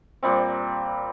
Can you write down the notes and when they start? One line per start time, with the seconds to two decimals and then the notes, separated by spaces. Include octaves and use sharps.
0.23 A#2 G3 C4